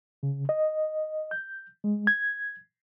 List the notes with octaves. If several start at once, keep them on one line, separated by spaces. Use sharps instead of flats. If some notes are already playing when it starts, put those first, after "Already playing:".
C#3
D#5
G6
G#3
G#6